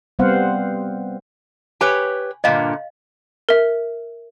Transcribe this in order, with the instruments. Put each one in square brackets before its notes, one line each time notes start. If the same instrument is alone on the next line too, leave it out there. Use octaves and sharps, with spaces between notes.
[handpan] G3 B3 C4 C5 F5 F#5
[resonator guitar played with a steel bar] G4 B4 C#5 [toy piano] G#5
[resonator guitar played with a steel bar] G2 A#2 D3 [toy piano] D#5 F5
[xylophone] A#4 E5